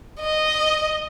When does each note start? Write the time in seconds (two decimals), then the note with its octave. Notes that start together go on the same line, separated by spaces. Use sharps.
0.20 D#5